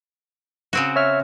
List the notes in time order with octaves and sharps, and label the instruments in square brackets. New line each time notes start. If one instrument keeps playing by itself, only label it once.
[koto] C#3 C4 F#4
[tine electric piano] C#5 E5 F6